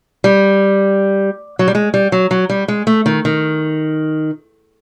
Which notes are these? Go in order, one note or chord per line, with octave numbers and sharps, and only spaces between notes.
G3
F#3
G3
G#3
G3
F#3
F#3
G3
G#3
A3
D#3
D#3